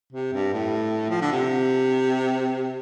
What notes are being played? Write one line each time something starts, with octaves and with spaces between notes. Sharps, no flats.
C3
G2
A2
F3
D3
C3